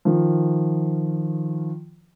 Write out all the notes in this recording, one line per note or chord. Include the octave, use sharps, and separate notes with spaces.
D#3 F3